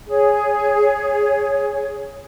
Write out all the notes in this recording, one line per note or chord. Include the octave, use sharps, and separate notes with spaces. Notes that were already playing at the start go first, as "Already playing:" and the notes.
G#4 C#5